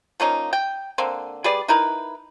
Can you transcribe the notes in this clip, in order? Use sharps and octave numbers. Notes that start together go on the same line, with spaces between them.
F3 A#3 C#4 D#4
G5
D3 A#3 C4
G3 G#4 B4 D5
D#4 E4 A#4 B4